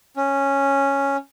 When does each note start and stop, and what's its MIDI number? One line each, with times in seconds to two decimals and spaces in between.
0.17 1.17 61